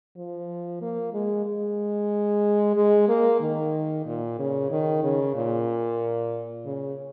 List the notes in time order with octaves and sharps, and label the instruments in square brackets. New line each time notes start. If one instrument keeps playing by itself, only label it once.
[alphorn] F3
A#3
G#3
G#3
G#3
A#3
D#3
A#2
C#3
D#3
C#3
A#2
C#3